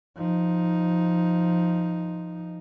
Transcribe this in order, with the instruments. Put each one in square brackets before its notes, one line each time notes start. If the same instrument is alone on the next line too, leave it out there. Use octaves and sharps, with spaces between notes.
[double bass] F3 D#4